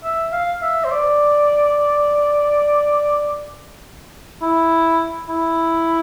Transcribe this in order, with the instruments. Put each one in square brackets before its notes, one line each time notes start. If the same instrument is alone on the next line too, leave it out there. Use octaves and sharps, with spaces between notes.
[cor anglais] E5
F5
E5
C5
D5
E4
E4